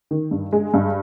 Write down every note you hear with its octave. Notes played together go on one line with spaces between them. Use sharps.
D#3
G2
G#3
G2